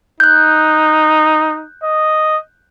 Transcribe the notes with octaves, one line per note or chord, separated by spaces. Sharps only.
D#4 F#6 G6
D#5